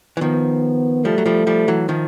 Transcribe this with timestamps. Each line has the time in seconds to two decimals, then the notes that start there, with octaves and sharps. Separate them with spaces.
0.17 E3
0.21 D#3 F3 B3
1.05 F3 G3 A3
1.18 F#3
1.26 F3 G3
1.47 F3 G3
1.68 E3 F#3
1.89 D#3 F3